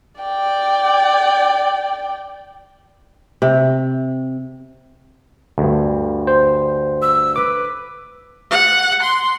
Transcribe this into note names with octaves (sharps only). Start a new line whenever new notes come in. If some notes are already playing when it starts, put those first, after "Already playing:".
D5 G5
C3
D2 G2
C5
E6
B4 D6
F#5
C6